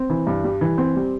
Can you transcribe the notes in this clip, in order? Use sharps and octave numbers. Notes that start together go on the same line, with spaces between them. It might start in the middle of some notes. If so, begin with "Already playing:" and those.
Already playing: C4
E3
G2
G3
E3
C4
G3